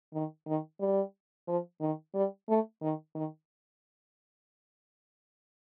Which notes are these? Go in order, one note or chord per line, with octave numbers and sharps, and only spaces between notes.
D#3
D#3
G3
F3
D#3
G3
A3
D#3
D#3